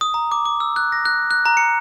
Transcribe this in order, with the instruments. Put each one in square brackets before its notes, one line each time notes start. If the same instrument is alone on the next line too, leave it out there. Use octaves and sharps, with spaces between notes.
[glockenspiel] D#6
A#5
D6
D6
E6
F#6
A#6
F#6
F#6
A#5
C#7